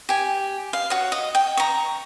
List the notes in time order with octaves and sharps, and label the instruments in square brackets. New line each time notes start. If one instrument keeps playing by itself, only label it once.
[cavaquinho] G4 G#5
F5
F#4 C#5
D#5
G5
A#5 C#6